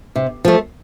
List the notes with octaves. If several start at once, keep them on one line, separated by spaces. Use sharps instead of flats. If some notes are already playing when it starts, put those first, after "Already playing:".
C3
F3 A3